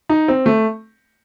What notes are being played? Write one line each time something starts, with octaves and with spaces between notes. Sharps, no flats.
D#4
C4
A3